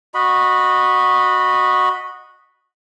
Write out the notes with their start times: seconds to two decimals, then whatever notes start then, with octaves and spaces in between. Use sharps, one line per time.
0.14 F#4 D#5 B5